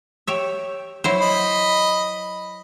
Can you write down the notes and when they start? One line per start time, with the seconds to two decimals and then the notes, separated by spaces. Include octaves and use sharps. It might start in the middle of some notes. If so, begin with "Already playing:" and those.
0.27 G4 C#5 E5
1.04 F#3 E4 C5
1.21 D#5 B5